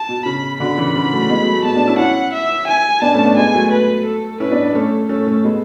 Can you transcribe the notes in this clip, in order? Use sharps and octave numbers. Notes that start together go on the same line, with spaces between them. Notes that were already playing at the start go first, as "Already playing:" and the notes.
Already playing: A5
B2
C#3 B5
B2 D3 B5
C#3 E3
C#3 E3
F#3 A3
G#3 B3
F#3 A3
F#3 A3
G#3 B3 A5
B3 D4
C#4 E4
C#4 E4 F#5
E5
G#5
B3 D4 A5
A3 C#4
B3 D4
G#3 B3 G#5
F#3 A3
B4
A4
C#4 E4 B4
B3 D4
B3 D4
A3 C#4 A4
A3 C#4 A4
A3 C#4
G#3 B3